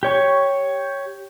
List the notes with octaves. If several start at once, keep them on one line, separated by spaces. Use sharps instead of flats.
G4 C#5 C#6